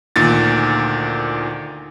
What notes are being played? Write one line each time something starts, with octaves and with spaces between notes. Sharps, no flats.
D2 A#2 D#3 A6